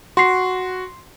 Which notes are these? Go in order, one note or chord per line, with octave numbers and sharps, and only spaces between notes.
F#4 C6 C7